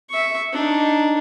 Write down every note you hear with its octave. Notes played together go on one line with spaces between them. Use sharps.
E5 C#6
D4 D#4